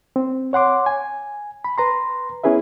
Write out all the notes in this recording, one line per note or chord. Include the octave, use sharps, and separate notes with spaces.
C4
C#5 F#5 C6 D6
G#5
B5
B4 A#5 C6
B3 C#4 E4 G#4 B4 E5